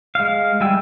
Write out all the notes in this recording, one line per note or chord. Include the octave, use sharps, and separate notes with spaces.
G#3 F5
G3 E4 G#4 G5 E6